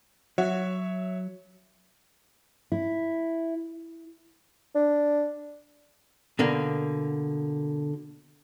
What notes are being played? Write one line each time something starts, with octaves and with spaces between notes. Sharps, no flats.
F#3 F#4 C#5 E5
E4
D4
B2 D3 A#3